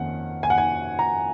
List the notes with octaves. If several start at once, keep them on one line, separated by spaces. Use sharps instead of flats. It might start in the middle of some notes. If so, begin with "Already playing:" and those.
Already playing: F2 D#3 A#3 C#4 F#5
G#5
F#5
G#5
A#5